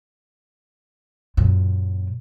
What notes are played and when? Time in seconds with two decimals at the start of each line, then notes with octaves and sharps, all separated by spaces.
1.37 F#2 A#2